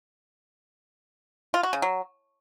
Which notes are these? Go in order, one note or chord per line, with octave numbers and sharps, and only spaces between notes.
F4
F#4
C#3
F#3